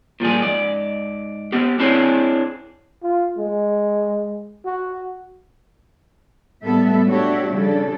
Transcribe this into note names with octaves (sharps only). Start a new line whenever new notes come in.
A#2 F3 G3 G#4
G#2 D5
B3 G4
C4 D4 E4 G#4 C5 C#5
F4
G#3
F#4
A2 G3 G#3 B3 A4 E5
D4 F#4 G4 C#5 E5
C#3 F3 G3 D4 A4